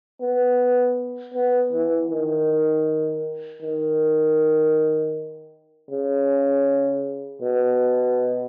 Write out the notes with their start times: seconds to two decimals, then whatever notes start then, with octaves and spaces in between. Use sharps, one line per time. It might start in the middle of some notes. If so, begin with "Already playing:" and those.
0.21 B3
1.34 B3
1.73 E3
2.10 D#3
3.62 D#3
5.90 C#3
7.42 B2